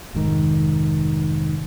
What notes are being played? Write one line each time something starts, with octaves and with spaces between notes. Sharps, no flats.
F1 G#2 D#3